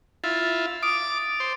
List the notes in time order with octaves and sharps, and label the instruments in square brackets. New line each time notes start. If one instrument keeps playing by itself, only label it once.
[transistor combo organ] E4 F4 [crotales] A6
[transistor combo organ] D6 [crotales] D#6 D7
[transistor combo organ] C5